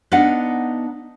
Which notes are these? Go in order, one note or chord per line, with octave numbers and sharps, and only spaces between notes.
B3 D4 D#4 F5 F#5